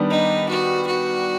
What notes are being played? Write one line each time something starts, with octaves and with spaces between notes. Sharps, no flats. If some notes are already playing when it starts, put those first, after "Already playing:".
Already playing: D#3 G3 B3 D4
D#4
F#4
F#4